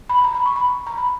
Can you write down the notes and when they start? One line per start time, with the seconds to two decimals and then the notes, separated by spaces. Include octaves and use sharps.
0.09 B5
0.24 A#5
0.34 B5
0.46 C#6
0.56 B5
0.87 A#5
0.97 B5